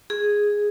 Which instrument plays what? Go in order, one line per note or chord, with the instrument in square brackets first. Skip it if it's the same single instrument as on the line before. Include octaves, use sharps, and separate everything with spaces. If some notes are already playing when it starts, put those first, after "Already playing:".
[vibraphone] G#4